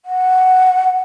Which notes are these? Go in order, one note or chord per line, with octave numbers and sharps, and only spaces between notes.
F#5